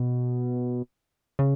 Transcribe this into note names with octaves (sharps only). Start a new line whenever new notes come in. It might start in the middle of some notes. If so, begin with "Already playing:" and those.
Already playing: B2
C#3